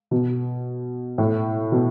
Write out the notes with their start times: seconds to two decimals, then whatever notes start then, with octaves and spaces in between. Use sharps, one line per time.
0.11 B2
1.18 A2
1.72 B2